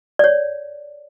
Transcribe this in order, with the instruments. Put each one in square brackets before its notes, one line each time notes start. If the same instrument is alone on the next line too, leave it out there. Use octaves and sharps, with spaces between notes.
[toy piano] C#5 D5